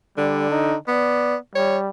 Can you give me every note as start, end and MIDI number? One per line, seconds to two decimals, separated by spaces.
0.17 0.74 50
0.17 0.45 55
0.50 0.76 63
0.88 1.36 59
0.88 1.36 74
1.55 1.90 55
1.55 1.77 73